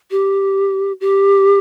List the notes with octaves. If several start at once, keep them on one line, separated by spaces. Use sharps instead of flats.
G4
G4